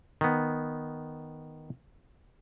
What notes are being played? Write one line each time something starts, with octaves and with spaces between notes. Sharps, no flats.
D#3 B3